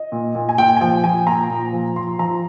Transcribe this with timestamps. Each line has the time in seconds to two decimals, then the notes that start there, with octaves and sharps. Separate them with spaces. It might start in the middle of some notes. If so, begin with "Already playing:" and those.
Already playing: D#5
0.12 A#2
0.35 A#2
0.49 G#5
0.58 A#2 G5
0.77 G#5
0.81 F3 G5
1.04 F3 G#5
1.27 A#2 A#5
1.50 A#2
1.73 F3
1.96 F3 C6
2.19 F3 A#5